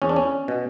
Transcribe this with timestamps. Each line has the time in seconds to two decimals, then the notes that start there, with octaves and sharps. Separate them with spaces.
0.02 E2 C#4
0.09 D4
0.16 C#4
0.48 B2